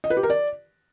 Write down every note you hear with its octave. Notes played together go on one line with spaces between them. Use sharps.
D#5
B4
G4
A#4
D5